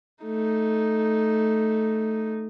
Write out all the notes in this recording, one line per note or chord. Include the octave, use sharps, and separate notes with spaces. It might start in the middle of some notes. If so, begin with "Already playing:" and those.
A3 D#4